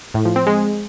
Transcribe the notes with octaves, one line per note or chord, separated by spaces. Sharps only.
A2
F3
C4
G#3